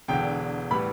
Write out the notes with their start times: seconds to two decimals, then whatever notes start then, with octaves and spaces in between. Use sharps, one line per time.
0.08 E1 E2 D3 G5
0.71 A2 E3 G3 B3 B5